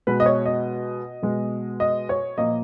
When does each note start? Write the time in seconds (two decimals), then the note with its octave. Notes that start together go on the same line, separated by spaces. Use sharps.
0.07 B2 G#3 B4
0.20 D#5
0.26 C#5
0.46 D#5
1.22 B2 G#3
1.80 D#5
2.09 C#5
2.38 A#2 F3 A#3 D#5